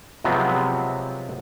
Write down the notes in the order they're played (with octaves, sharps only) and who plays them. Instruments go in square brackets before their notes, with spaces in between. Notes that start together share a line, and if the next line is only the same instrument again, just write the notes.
[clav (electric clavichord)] C3 F3 F#3 G#3 B3 C4